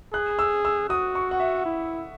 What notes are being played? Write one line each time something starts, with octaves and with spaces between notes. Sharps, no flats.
G#4 F#6
E6
E6
F#4 D#6
C#6
F#5
E5
E4